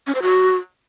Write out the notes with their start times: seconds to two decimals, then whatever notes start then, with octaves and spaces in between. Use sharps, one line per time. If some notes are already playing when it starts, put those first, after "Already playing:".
0.07 C#4
0.15 C5
0.22 F#4